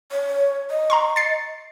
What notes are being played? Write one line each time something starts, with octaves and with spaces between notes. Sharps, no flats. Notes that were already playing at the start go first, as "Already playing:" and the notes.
C#5
D#5
A#5 C6 C#6
A6 C7 C#7